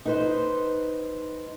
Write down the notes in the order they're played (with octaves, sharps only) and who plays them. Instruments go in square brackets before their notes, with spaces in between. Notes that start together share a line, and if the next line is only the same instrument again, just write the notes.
[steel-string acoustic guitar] D#4 B4 C5